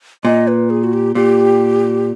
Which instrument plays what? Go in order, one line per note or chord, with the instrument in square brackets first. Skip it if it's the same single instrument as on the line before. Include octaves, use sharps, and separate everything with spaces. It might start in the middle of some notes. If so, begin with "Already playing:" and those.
[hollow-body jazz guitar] A#2 [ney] D#5
[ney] B4
G#4
F#4
G4
[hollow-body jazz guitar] A#2 [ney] G4